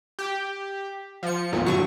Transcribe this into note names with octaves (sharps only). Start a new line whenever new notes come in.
G4
F3 C#7
G#1 E2 A#2
G2 D3 F#3 C#6